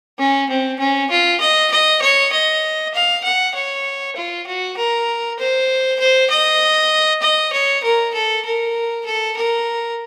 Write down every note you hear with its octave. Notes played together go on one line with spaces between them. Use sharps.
C#4
C4
C#4
F4
D#5
D#5
C#5
D#5
F5
F#5
C#5
F4
F#4
A#4
C5
C5
D#5
D#5
C#5
A#4
A4
A#4
A4
A#4